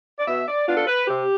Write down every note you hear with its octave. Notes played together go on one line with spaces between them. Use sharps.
D5
B2 E5
D5
B3 D4 F4
A4
B4
C3 G4